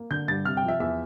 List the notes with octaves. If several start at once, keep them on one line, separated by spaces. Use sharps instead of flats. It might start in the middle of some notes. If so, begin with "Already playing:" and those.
Already playing: A#3
D3 G6
G2 A6
C3 F6
G5
F3
E5
E2 E5